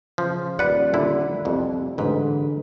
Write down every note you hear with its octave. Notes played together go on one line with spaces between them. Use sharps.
C#3 F3
D#1 B4 D5 F#5
A#2 D3 E4
C2 F2 C3
A1 G#2 D3 B4